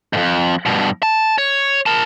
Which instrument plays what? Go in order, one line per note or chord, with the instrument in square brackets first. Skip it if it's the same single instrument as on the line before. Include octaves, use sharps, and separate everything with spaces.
[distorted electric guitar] F2 G#2
G2 B2
A5
C#5
A#4 A5